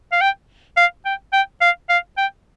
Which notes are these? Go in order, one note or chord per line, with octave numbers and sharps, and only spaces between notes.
F5
G5
F5
G5
G5
F5
F5
G5